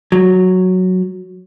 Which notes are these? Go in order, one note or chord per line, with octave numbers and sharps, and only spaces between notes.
F#3